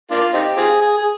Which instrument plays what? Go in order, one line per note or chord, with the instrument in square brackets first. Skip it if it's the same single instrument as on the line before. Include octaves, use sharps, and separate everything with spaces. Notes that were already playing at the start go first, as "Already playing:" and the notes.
[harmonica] A#3 D4 F4
C4 D#4 G4
C4 F4 G#4
G#4
G#4